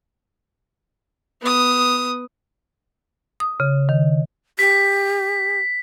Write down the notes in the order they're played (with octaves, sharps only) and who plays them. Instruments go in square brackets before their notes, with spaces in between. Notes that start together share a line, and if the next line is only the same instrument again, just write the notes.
[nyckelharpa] B3 D#6
[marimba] D#6
C#3
D#3
[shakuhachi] G4 [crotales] B6